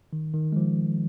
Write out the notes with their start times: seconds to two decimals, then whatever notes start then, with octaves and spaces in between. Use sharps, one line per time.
0.13 D#3
0.34 D#3
0.52 G#3
0.56 F3